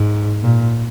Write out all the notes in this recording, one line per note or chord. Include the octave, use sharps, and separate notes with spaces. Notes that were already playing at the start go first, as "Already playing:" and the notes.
Already playing: G#2
A#2